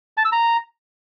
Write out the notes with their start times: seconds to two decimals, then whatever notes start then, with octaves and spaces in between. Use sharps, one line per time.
0.17 A5
0.25 E6
0.32 A#5